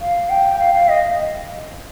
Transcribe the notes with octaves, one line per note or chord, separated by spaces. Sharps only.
F5
G5
F5
F5
D#5